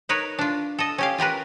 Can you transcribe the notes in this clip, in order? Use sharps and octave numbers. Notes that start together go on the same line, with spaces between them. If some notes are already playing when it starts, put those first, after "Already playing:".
D#4 A#4 B4 C#5
D4 F4
A4 D#5
C#4 G4 F5
F4 G4 A#4 B4